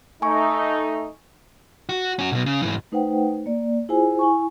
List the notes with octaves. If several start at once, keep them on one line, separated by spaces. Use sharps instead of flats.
A3 D#4 G#5 C#6
F#4
C#4 F#4
B1 B2
C#3
G#2 E3
A3 D#4 B4 C5 F#5 G5
A#3 D5
E4 F4 G#4 C5 G#5
E4 G#5 C#6